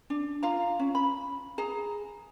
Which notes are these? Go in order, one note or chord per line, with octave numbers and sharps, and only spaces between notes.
D4
F4 F5 A#5
C#4
B5
G#4 A#5